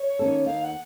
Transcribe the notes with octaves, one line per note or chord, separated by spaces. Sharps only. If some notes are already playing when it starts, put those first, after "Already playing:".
Already playing: C#5
D#3 A#3 C#4 A4
D#2 F5
F#5